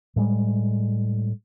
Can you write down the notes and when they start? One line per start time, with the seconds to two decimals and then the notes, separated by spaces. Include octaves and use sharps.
0.16 A2 G3 G#3